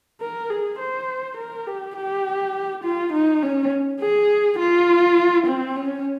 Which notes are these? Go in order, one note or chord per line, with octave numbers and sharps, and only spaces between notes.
A#4
G#4
C5
A#4
G4
G4
F4
D#4
C#4
G#4
F4
C4
C#4